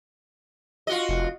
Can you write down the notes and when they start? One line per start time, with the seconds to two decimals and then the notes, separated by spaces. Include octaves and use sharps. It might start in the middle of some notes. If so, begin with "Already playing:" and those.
0.87 F4 F#4 D#5
1.09 F1